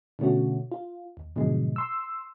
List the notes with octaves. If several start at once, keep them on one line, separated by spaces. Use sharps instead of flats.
B2 D3 A3 C#4 F#4
F4
D#2
G#2 B2 D3 F3 F#3 G#3
C6 E6